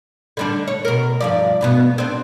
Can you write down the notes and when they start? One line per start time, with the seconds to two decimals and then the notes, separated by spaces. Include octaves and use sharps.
0.37 D3 G3 D4
0.68 C#5
0.85 B2 A#4
1.21 G2 F3 D5
1.61 G2 B2 B3
1.98 C4 D4